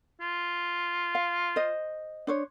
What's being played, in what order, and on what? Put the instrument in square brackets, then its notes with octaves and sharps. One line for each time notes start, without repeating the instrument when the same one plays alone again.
[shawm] F4
[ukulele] F5
C5 D#5
D4 C5 C#5